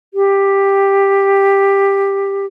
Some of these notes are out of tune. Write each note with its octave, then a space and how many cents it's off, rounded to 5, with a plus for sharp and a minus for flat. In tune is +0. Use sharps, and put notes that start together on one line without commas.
G4 +10